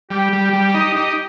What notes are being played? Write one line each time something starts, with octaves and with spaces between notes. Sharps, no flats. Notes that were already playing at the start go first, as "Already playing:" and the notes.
G3 G4
G3
G3
D#4
D#4 G4